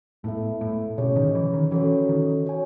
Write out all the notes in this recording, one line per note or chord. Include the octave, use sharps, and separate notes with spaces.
A2 B3 E4 A4 E5
A2
B2 C#4 G#4 C#5
D#3
E3
D#3
E3 C#4 F#4 A4 C#5
D#3
F#4 C#5 G#5